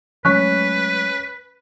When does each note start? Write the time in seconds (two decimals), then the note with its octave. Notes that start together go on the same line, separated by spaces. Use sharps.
0.25 F#3 G#3 A3 C#4 B4 C#6 F#6 B6